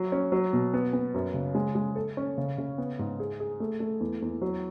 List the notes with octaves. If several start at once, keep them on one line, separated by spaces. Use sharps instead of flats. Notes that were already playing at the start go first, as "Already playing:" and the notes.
Already playing: F#3
C#4
F#3
B2
B3
B3
F#2
C#3
G#3
G#3
A4
C#4
C#3
C#3
B3
G#2
G#4
G#4
A3
A3
E2
E2
F#3